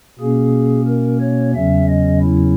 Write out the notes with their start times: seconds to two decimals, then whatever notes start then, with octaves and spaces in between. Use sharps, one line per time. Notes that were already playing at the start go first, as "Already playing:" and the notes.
0.19 B2 A#3 C#4 G#4
0.87 A#4
1.21 C#5
1.54 E2 C#3 F#3 C#4 E5
1.89 D#5
2.22 E4